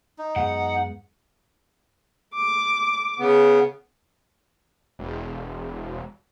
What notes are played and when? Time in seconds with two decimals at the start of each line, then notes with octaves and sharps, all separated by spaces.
0.18 D#4
0.36 F#2 G#3 B3 F#5
2.35 D6
3.19 C#3 B3
4.99 E1